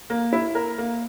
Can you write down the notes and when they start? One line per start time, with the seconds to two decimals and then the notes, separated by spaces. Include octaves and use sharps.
0.10 A#3
0.33 E4
0.55 A#4
0.78 A#3